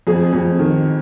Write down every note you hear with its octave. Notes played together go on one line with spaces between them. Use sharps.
F2 G#4
F2
D#3